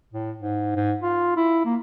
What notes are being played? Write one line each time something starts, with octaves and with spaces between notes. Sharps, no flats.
A2
G#2
G#2
F4
E4
A#3